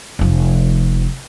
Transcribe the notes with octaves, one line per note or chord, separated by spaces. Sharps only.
F1 F3